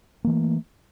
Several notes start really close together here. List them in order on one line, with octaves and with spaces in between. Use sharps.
A#3 E3 A3